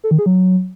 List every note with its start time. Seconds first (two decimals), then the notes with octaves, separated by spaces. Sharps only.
0.04 A4
0.11 D#3
0.19 G#4
0.26 F#3